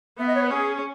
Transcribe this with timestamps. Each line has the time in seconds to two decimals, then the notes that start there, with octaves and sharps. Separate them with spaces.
0.18 B3 E5
0.26 D#5
0.34 C#5
0.42 B4
0.50 C#4 G#4